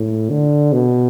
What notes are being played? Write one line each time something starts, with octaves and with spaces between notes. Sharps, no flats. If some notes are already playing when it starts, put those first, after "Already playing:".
Already playing: A2
D3
B2